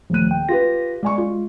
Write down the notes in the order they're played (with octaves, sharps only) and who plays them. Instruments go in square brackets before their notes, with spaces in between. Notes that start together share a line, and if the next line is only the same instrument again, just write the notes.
[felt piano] D#1 D#7 [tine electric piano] F3 A3 F#6
[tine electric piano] G5
[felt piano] F4 G4 B4 [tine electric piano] A#6
[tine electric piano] G#3 [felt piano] D5 G#5 C#6
[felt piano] F4